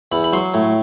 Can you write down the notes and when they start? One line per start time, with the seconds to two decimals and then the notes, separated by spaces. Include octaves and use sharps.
0.12 E2 B5
0.24 B5
0.33 F#3 C6
0.54 A2